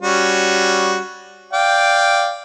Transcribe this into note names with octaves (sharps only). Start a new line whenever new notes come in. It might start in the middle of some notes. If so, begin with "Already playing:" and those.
G3 C#4 F#4
D5 F5 G5